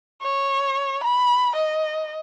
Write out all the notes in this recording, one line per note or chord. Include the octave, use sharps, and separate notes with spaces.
C#5
B5
D#5